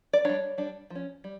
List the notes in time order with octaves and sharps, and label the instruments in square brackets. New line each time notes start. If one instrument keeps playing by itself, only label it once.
[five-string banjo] D5
G3 D4 C#5
G3 D4
F3 C#4
G3